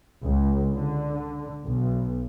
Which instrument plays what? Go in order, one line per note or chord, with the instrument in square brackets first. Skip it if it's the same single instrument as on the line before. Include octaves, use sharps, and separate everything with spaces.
[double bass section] C#2
D3
B1